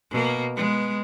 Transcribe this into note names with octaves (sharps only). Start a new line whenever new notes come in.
B2 A#3
G#3 B3